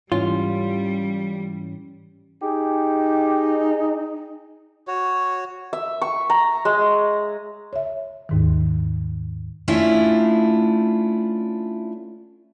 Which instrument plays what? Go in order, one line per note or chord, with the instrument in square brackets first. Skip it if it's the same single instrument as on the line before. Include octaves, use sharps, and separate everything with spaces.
[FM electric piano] G#2 E3 C#4 [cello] G3 [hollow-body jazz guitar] F4
[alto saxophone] D#4 [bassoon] G4 [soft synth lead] G#4
[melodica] F#4 C#5
[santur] E5
C#6
A#5
G#3
[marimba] C#5 E5
D#2 G#2 D#3
[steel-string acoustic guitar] A3 C#4 D4 E4 F4